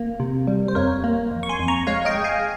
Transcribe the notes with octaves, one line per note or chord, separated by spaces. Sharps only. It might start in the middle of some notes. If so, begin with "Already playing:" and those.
Already playing: A#3
C3
G3
C5
F2 A#4 C#5
A#3
F2
C#6
G#5 C6
F2
A#5 C#6
G#3 C#5 F5
D#5 G5
G#3
F5 G#5